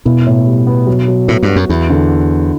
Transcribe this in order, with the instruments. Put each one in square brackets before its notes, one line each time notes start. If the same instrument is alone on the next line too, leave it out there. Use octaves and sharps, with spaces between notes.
[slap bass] B2 [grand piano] E4
[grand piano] A2
G3
B3
F#3
F#3
[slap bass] A2 [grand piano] B3
[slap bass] G2
[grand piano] F#4
[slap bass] F#2
[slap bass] E2 [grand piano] E4
[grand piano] D3